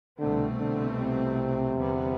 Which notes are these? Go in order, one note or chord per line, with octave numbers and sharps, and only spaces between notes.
C2 B2 D3 A3 C4
D3
C3
E2 D3 G3 B3